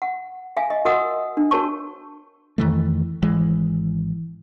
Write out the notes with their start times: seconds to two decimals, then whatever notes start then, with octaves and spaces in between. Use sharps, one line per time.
0.02 F#5
0.57 E5 F5 G#5
0.70 D#5
0.85 F#4 A#4 D#5 F#5 D#6
1.37 D4
1.51 F#4 A#4 C#5 A5 C#6
2.58 F2 D#3 E3 A3
3.22 G#1 E3 G#3